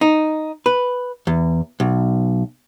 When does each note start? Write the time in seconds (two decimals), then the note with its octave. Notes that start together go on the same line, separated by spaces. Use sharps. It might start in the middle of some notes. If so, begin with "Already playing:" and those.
0.01 D#4
0.66 B4
1.27 E2
1.80 B1